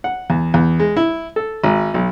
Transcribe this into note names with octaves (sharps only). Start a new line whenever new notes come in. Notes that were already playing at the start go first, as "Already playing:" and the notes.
F#5
E2
E2
G#3
E4
A4
G#1
B1